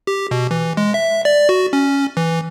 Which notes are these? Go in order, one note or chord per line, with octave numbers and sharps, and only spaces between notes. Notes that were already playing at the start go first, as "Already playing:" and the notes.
G4
B2
E3
G#3
E5
D5
F#4
C#4
E3